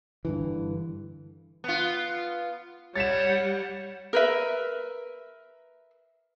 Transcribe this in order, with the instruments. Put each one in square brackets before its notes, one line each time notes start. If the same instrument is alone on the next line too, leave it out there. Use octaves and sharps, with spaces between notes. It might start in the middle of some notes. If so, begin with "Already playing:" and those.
[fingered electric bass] G2 D3 E3
[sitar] B3 F4
[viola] G3 F#5 [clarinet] C#5 [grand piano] A6 B6 E7
[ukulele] A#4 B4 E5